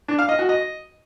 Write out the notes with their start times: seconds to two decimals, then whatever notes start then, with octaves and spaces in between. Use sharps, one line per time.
0.08 D4
0.19 F5
0.29 D#5
0.39 F#4
0.49 D#5